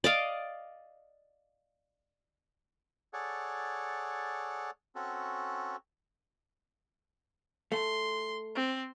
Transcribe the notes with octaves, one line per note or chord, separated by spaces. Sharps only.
D5 D#5 F5
G#4 A4 C#5 D5 F#5
C4 C#4 F#4 A4
A3 C6
C4